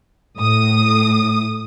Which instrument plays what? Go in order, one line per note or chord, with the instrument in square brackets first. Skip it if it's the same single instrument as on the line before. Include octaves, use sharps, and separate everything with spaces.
[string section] A2 D#6